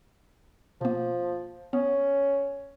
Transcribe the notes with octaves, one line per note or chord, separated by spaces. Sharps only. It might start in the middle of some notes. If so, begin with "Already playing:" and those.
B2 F3 A#3
B3 C#4